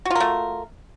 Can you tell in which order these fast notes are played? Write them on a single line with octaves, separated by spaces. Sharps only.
F#4 F4 A#4 A3